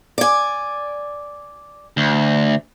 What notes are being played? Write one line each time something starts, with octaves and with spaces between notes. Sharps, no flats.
D5 G#5
D2